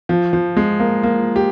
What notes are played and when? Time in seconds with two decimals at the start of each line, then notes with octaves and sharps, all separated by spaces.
0.09 F3
0.33 F3
0.57 G#3
0.80 A#3
1.03 A#3
1.36 G4